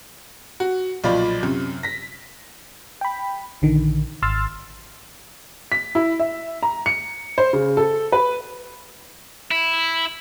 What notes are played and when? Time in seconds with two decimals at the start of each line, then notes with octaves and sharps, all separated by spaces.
0.60 F#4
1.04 B1 A#2 F3 F4 D5 B5
1.43 F#2 C3
1.83 A#6 B6
3.01 G5 B5
3.62 A#1 D3 D#3
4.22 G#1 C6 E6 F6 A6
5.72 B6
5.95 E4
6.20 E5
6.63 A#5
6.86 C#7
7.38 C5
7.53 C#3
7.77 A4
8.12 B4
9.51 E4